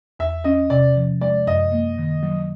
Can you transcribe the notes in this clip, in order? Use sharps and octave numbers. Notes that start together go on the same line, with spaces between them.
E2 E5
C#4 D#5
C3 D5
F3
G#3 D5
F#2 D#5
A#3
D#3
F#3